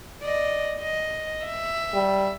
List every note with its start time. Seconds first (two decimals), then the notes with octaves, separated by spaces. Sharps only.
0.23 D5 D#5
0.80 D#5
1.45 E5
1.94 G3